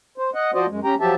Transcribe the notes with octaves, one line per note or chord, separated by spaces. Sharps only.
C5
D#5 F#5
F3 F#4 C5 D5 D#5
F#2 G#3
C#4 G4 G5 A#5
F3 F#3 G4 E5 A5